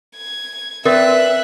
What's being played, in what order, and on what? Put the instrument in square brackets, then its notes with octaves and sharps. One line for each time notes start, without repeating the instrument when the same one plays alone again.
[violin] G#6
[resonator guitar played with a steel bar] C4 B4 D5 [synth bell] A#4 [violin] E5 F#6